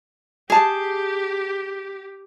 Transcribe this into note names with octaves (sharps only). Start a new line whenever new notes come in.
G4 G#4 A5